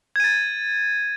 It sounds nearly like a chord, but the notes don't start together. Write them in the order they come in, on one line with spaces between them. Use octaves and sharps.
G#6 D#7 A6